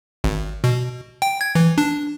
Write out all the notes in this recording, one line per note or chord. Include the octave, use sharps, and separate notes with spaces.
G#1
B2
G5
G#6
E3
D4